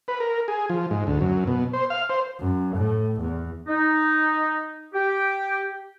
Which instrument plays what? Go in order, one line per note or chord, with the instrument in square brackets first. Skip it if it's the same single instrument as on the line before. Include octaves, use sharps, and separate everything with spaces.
[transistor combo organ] B4
A#4
G#4
F3
G#2
D2
F#2
B2
C5
F5
C5
[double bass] F#2
A2
E2
[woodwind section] D#4
G4